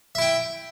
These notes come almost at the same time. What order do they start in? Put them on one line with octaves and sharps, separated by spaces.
E5 E4 G5